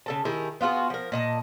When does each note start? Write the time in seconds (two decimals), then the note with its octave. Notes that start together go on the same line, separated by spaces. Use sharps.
0.06 C#3 A4 A5
0.25 D#3 E4 G4 G#4
0.61 B3 F4 F#4 G#4
0.90 F3 A#4
1.12 A#2 D#5 A5